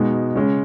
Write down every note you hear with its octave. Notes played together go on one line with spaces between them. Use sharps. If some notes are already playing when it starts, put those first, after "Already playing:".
Already playing: B2 G#3 D#4 F#4
C#3 G#3 C#4